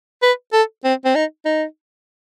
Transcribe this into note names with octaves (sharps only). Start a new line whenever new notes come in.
B4
A4
C4
C4
D#4
D#4